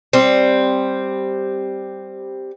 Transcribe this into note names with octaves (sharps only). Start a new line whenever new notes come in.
G3 C4